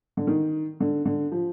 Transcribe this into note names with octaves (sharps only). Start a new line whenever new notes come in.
D3
D#3
D3
D3
F3